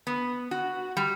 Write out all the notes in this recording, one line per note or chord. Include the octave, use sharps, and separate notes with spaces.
B3
F#4
G3